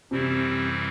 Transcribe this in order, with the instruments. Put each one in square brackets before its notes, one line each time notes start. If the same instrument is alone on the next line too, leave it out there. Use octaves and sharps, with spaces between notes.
[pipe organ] F#2 E3 G3 C4 E4 [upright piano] C3